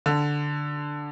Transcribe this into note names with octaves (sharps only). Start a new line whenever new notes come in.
D3